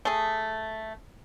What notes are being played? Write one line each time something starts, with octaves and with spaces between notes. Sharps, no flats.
A3 G#4